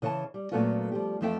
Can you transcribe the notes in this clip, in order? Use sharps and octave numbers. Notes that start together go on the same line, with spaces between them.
C#3 E3 C#5 G#5 A5
G3
A#2 F#3 A3 B3 C#4 F4
F3 G3 G4
F2 E3 F3 A3 E5 G5